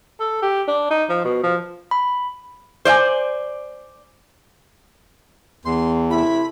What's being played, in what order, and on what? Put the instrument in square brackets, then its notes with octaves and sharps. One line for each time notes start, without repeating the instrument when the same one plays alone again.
[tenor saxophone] A4
G4
D4
D#4
F3
B2
F3
[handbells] B5
[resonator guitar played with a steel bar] C5 D5 E5 G#5
[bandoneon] E2 [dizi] C6
[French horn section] C3 A3 E4 [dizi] B5